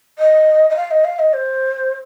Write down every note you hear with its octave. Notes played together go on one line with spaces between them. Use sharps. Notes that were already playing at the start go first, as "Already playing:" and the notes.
D#5
D#5
F5
D#5
F5
D#5
C5